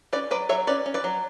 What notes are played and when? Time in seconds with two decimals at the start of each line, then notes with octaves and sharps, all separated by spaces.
0.13 C#4 B4 D5
0.31 F#3 B4 D5
0.49 F#3 C#5 E5
0.67 C#4 B4 D5
0.86 C#4
0.94 B4 D5
1.04 F#3